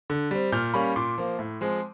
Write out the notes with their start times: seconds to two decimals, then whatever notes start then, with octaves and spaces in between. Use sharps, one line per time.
0.10 D3
0.31 G3 C4
0.52 A#2 F6 G6
0.74 G3 A#3 C#4 B5 C#6
0.96 A#2 C6 D6
1.18 F3 A#3
1.39 A2
1.61 F3 G#3 C4